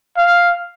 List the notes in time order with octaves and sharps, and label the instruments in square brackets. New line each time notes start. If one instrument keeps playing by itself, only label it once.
[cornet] F5